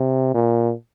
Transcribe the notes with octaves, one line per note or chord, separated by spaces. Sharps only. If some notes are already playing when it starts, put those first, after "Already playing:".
Already playing: C3
A#2